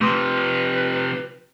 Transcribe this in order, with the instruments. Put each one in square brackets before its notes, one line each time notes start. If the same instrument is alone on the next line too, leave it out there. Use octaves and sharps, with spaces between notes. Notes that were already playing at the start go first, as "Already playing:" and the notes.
[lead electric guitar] C3 F3 [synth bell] A3 C6 D#6 [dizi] B4